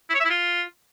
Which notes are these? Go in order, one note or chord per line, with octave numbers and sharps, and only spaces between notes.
E4
C#5
E5
E4
F4